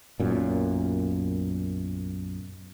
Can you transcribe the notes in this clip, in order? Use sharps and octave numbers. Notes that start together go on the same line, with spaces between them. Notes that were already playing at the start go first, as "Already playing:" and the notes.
B1 F#2 A#2